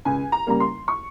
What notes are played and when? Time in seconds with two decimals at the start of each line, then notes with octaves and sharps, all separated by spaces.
0.05 C#2 G#5
0.32 A#5
0.47 C#3 G3 A#3 A#5
0.60 C6
0.88 C#6